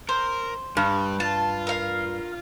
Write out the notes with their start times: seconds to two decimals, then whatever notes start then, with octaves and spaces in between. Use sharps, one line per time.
0.09 A#4 C5
0.77 G2 G3
1.20 F4 A5
1.67 A#4 F5